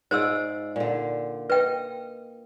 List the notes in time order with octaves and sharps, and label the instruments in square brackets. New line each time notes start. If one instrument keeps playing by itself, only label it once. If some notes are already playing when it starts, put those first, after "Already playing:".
[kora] G#2 F4 D5 [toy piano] C5 E6
[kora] A#2 D3
[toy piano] B4 G5 [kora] D#5